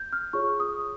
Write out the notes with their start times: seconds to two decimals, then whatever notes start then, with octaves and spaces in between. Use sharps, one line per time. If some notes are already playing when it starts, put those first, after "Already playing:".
Already playing: G6
0.13 F6
0.33 F4 G#4 C#5 C#6
0.60 D#6